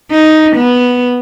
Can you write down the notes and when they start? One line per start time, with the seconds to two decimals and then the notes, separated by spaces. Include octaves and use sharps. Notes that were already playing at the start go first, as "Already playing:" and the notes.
0.11 D#4
0.56 B3